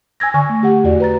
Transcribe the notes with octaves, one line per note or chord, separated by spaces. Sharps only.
G#5 E6 G#6 A#6
D3 G#5 C#6
A3
G4 F#5
E2 F#4 D5
B4 A#5 A6